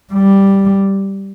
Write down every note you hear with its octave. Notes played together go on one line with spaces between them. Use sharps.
G3